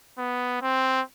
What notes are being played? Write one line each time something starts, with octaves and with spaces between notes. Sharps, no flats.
B3
C4